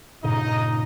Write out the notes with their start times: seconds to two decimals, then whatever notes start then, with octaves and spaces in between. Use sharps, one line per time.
0.24 G2 A#2 C#3 D#4 D#5